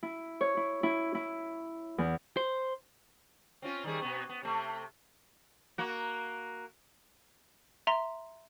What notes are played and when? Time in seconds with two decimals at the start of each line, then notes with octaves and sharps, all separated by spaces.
0.03 E4
0.41 C#5
0.57 E4
0.83 E4
1.15 E4
1.98 E2
2.37 C5
3.62 C4 C#4 F4
3.84 D#3 G3 G#4
4.02 B2 B3
4.29 B3
4.43 C3 A3
5.78 A#3 F#4
7.87 E5 A#5 C6